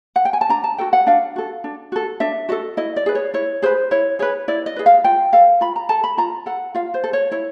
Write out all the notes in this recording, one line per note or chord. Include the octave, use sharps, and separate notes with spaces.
F#5
G5
G#5
A5
D4 A#5
A5
F#4 A4 G5
F#5
D4 F5
F#4 A4
D4
F#4 A4
D4 E5
F#4 A4 D#5
E4 D#5
D5
G#4 B4
C#5
E4 C#5
G#4 B4 C5
E4 C#5
G#4 B4 C#5
E4 D5
D#5
G#4 B4
F5
F4 G5
A4 F5
F4 B5
A#5
A4 A5
B5
F4 A#5
A4 F#5
F4 F5
C5
A4
C#5
E4 C#5